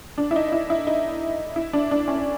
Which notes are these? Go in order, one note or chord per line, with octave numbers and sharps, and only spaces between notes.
D4
E4
D#4
D#4
E4
E4
D#4
E4
D4
D4
C#4